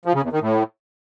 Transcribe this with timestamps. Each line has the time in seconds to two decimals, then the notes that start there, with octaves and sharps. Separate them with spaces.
0.05 F3
0.14 C#3
0.23 E2
0.32 D#3
0.41 A2